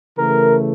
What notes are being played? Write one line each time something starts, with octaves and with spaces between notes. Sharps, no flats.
C#3 E3 A3 A#4